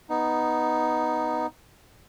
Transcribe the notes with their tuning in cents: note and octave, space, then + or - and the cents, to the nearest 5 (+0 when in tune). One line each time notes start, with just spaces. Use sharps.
B3 +0 D#4 +0